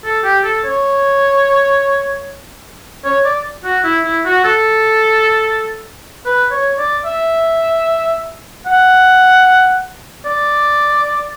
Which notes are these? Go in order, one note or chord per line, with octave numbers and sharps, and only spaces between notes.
A4
G4
A4
C#5
C#5
D5
F#4
E4
E4
F#4
A4
B4
C#5
D5
E5
F#5
D5